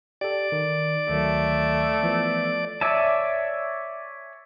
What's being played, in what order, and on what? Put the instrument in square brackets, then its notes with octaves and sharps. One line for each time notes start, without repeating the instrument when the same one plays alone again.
[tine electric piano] G4 A4 [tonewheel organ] D5
[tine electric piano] D#3
[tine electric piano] D2 D#3 F#3 [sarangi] A3
[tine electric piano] E3 F3 B3
[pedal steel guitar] C#5 D5 E5 G#5 A5